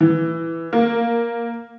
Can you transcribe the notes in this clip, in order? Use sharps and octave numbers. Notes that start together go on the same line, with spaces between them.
E3
A#3